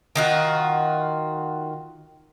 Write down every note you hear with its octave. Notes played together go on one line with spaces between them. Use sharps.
D#3 F4 F#4